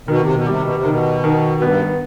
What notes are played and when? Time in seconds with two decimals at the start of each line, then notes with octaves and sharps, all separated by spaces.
0.08 B2 D#3
0.21 C3
0.35 B2
0.46 C3 G3
0.62 B2
0.75 C3
0.84 B2 D#3
1.24 D#3
1.62 G2 B3